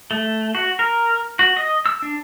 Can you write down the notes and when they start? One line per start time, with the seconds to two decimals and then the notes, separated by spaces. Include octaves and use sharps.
0.11 A3
0.55 F#4
0.79 A#4
1.39 F#4
1.57 D#5
1.86 E6
2.02 D4